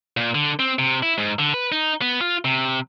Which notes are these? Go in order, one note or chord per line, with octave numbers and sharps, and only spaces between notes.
A#2
D3
C4
C3
E4
G#2
D3
B4
D#4
B3
F4
C3